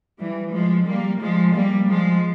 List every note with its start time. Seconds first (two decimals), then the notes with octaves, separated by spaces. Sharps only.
0.19 E3 G3
0.53 F3 G#3
0.87 G3 A#3
1.21 F3 G#3
1.55 G3 A#3
1.89 F3 G#3